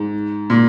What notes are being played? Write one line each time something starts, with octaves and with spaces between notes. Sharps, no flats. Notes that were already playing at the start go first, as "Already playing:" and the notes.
Already playing: G#2
A#2